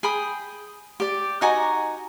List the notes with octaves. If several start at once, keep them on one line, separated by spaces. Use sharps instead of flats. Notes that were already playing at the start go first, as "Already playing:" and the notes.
G#4 G5 B5 D#6
G4 D5
D#4 F#4 G#5 A#5